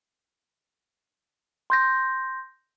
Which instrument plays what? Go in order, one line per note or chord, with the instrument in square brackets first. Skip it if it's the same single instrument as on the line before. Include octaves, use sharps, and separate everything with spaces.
[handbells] C6 G6 A#6